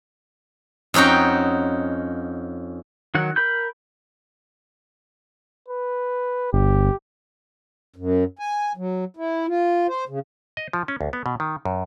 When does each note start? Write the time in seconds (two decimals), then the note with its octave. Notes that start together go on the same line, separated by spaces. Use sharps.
0.94 F2 C#4 D#4 F#4 G5
3.15 D#3 F#3 F#5
3.36 A#4 B5 G6
5.68 B4
6.53 G1 G4
7.96 F#2
8.39 G#5
8.77 F#3
9.17 E4
9.48 F4
9.88 C5
10.09 C#3
10.57 D#5
10.73 F3
10.88 C#4
11.01 D2
11.13 B3
11.26 B2
11.40 D#3
11.65 F#2